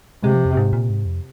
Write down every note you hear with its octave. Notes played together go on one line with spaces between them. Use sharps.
C3 G#3
F3
F2
G#2
A#2
G#2
F2